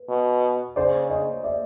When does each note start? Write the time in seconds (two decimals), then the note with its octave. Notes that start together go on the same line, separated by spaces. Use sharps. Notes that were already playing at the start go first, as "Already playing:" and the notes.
Already playing: B4
0.09 B2
0.76 C#3 C5 D5
1.09 C#5 D#5
1.44 D5 E5